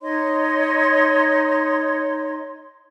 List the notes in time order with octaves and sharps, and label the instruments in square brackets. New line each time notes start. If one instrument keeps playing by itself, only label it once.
[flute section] D#4 C#5 D#5 C6